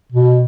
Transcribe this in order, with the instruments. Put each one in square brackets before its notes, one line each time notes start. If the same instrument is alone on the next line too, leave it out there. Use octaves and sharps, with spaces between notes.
[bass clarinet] B2